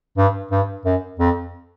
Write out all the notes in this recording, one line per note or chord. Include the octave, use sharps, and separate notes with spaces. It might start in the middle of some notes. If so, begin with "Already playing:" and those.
G2
G2
F#2
F2